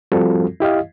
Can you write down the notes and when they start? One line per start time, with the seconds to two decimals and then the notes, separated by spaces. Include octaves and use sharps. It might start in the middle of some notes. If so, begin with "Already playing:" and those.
0.12 F3 G3 C4 F4 F#4 A4
0.60 E4 G4 D#5 F5